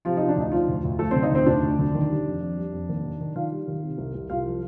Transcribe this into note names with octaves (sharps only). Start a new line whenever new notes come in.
C3 F3 F4
F3 D#4
D4
D2 D#4
F3 F4
D2
D2
F3 A3 A4
D3 C4 C5
D#4 D#5
D2 C4 C5
D2 D4 D5
D2
D3
D#3
G3
F2
F2
G3
F2
D#2
D#3
D#3
D#3 F4 F5
G3
D#3
C3
C2
C2
C2 F4 F5
F3